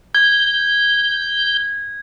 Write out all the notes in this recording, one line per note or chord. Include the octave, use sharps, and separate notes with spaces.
G6 G#6